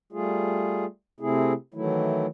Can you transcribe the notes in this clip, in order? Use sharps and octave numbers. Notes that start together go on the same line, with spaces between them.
G3 A3 F4 G#4
C3 A3 C4 E4 G#4
D#3 E3 F#3 A3 E4